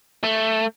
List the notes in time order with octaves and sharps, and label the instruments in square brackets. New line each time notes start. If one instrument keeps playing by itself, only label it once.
[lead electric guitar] A3